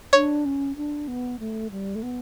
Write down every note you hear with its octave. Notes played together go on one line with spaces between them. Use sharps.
D4 C#5
C#4
D4
B3
A3
G3
A3
B3